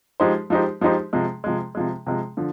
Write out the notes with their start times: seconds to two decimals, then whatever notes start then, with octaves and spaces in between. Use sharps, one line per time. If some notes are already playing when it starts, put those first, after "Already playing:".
0.20 F3 G#3 D#4 G4 C5
0.50 F3 G#3 D#4 G4 C5
0.81 F3 G#3 D#4 G4 C5
1.13 C3 F3 G#3
1.44 C3 F3 G#3
1.75 C3 F3 G#3
2.07 C3 F3 G#3
2.37 D3 F3